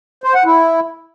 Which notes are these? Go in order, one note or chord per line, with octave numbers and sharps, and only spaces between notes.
C5
F#5
E4